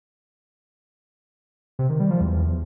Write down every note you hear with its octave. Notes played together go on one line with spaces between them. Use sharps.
C3
D#3
G3
F3
E2